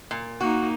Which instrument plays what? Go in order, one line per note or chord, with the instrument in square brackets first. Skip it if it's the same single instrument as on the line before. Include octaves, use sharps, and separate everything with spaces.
[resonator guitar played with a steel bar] A#2
[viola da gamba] A#3 D#4 [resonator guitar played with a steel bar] F#4